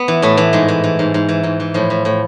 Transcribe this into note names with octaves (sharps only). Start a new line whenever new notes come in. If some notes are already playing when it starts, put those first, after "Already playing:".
Already playing: B3
E3
A2 A3
E3
G#2 G#3
E3
E3
G#2
G#2
E3
G#2
E3
A2 F3
A2
A2